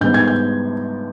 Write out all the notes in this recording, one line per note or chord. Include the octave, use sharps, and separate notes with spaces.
G#2 G3 B3 D#4 G6
G#6
G6